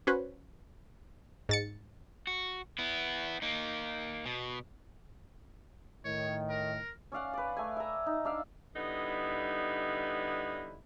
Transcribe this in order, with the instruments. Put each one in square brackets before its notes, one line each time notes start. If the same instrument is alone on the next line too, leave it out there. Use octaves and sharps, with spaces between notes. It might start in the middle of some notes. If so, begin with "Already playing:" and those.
[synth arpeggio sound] C#4 F#4 B4 C5
G#2 A6 C#7
[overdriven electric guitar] F#4
B3 E4
A#3 D#4
B2
[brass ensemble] A2 D#3 [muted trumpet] C#5
[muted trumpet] A#4
[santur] C#4 D5 F5 F#5
B4 D5
A3 G#5
E5 A#5
D#4
D4 D5 E5 F5
[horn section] D3 G3 B3 D#4 E4